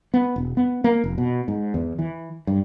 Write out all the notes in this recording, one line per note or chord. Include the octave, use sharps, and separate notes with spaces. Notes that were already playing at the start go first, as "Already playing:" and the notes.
B3
E1
B3
A#3
F1
B2
G#2
E2
E3
G2